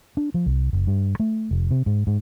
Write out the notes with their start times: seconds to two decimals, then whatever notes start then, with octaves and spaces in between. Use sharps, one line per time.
0.17 D4
0.34 F3
0.46 C2
0.73 F#1
0.87 G2
1.20 A3
1.51 F1
1.71 C3
1.86 G#2
2.07 G#2